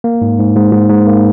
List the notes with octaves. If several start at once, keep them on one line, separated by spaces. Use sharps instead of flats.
A#3
G#2
G#2
G#2
G#2
G#2
A#3